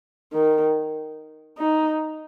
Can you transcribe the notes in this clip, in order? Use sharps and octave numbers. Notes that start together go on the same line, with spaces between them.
D#3
D#4